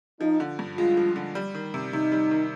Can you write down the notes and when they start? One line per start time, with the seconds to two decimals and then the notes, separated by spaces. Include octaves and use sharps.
0.21 F3 D#4
0.40 D3
0.59 G2
0.77 G#3 F4
0.97 F3
1.16 D3
1.35 G3
1.54 D#3
1.74 C3
1.93 C3 D#4
2.12 G3
2.31 D#3